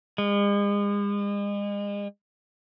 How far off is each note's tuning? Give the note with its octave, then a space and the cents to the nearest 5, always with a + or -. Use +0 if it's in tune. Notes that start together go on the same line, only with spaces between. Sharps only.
G#3 -40